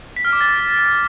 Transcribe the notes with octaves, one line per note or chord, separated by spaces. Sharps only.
B6
F6
D6
A6